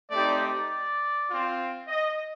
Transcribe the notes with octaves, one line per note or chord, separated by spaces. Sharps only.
A3 C4 D#4 G4 D5
D5
C4 F4
D#5